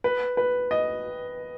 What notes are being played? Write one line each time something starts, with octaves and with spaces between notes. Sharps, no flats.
B4
B4
D#5